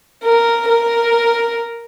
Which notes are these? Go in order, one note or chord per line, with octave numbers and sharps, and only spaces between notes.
A#4
A#4